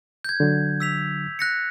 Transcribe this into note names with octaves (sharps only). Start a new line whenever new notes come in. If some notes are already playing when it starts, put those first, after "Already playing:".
G6 G#6
D3 F#3
E6 B6 F7
F#6 A#6 C#7